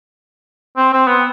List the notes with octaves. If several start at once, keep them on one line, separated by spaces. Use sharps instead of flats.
C4
C4
B3